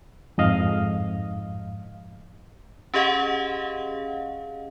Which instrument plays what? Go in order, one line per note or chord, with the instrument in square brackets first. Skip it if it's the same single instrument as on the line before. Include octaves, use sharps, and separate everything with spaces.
[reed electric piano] F2 G#2 D#5 F5
[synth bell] C#4 G4 G#4 D#5 F5 F#5